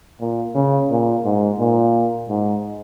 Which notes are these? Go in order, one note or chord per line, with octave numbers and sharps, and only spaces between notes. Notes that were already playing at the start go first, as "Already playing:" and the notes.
A#2
C#3
A#2
G#2
A#2
G#2